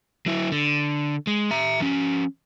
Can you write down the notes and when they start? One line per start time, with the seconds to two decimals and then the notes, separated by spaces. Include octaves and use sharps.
0.26 F#3 E4
0.52 D3
1.27 G#3
1.51 E5 A#5
1.80 F3 C#4